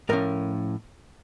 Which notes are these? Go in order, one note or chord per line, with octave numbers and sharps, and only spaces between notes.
A2 F3 C#4 A#4